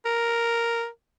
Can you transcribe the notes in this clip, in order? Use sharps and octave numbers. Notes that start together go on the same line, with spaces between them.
A#4